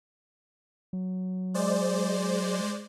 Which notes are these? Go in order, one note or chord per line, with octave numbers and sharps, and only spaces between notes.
F#3
G#3 C5 D5